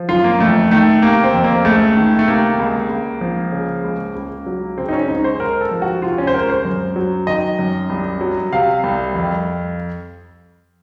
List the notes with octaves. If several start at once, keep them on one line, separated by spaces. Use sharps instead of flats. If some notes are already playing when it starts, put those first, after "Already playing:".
Already playing: F3
F#2 F4
A#3
F2 A3
D#3 A3
C3 A#3
C4
F2
A#3
C#2 A3
D#3
A3
C3 A#3
C#2
C#2
F3
C#3
C#2
C#2
F#3
C#3 C4
D#4
C#4
C#2 D#4
C5
C#2 A#4
A4
F3
F#4
C3 F4
C#4
C5
C#2 A#4
C5
F#2
F#3
D#3 D#5
F#2
C2
F#3
C3 F5
C2
F2